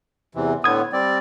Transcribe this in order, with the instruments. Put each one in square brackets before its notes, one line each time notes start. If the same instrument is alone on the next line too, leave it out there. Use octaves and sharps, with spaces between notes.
[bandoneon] E2 C3 E3
[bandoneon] A2 D3 B3 [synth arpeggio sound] D#6 G#6
[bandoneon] G3 C4 D5